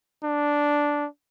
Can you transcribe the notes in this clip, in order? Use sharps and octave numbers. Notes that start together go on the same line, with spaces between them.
D4